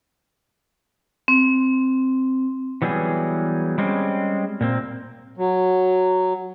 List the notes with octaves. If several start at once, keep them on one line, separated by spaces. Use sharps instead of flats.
C4
E3 F#3 G3 B3 G#4
G3 G#3 C4 C#4
A#2 A#3 C4
F#3